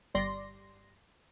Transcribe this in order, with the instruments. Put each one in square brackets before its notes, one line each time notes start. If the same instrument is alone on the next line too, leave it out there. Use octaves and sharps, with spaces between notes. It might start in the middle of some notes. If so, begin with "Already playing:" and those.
[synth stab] G1 G3 D5 C6 A#6